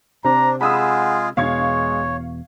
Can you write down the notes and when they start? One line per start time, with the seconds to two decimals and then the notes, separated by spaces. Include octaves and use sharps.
0.25 C3 C4 D4 A#5
0.61 G#3 F4 G#4 F#5 B5 D#6 E6
1.37 E1 E2 B2 G#3 C#5 F5 C#6 G#6